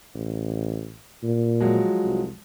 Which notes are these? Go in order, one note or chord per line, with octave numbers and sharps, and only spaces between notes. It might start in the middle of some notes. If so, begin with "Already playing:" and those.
A1
A#2
F3 F#3 G#3
C2